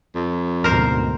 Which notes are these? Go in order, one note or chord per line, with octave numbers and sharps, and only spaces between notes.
F2
D2 G#2 B2 A#4 C5